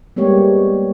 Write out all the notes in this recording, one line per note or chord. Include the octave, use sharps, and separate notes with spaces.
G3 G#3 A#3 B3 G4 C#5